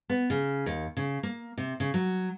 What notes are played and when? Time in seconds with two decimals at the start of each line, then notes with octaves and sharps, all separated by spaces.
0.09 B3
0.30 C#3
0.66 D#2
0.97 C#3
1.23 A#3
1.58 C3
1.80 C#3
1.94 F#3